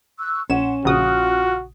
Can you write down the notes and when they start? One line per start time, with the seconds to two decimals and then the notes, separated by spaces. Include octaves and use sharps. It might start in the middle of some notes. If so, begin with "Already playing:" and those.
0.18 C#6 E6 F#6
0.50 A#1 C#4 F#5 C6 E7
0.85 A#1 C#3 F4 F#4 D#6 F6 F#6